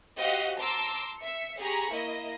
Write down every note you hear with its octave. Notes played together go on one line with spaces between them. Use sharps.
F#4 G4 C5 D#5 F5 F#5
A5 A#5 C6 D6 E6
E5 C#7
G4 G#4 A#5 B5 C#6
A#3 E4 D#5